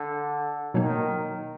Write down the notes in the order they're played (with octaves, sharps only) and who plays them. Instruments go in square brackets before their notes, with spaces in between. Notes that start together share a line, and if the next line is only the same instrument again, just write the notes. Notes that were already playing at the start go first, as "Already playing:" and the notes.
Already playing: [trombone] D3
[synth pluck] B2 F#3 A#3 D#4 [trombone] D#3